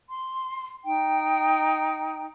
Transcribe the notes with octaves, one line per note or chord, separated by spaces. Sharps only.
C6
D#4 G5